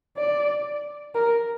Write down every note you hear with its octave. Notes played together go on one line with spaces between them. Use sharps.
D5
A#4